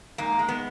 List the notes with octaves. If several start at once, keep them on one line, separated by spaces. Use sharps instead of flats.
G#2 A#3
G#3
B3